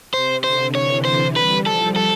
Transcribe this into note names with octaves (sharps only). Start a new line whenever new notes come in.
C3 C5
D3 C5
E3 C#5
C5
G3 B4
F3 A4
A4